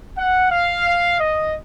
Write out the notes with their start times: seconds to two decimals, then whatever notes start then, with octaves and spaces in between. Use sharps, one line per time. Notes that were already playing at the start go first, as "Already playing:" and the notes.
0.17 F#5
0.51 F5
1.20 D#5